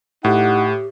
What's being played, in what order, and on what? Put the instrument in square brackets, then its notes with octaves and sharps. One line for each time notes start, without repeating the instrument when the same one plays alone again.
[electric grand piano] A2 [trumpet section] D#4 F#5 [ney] G4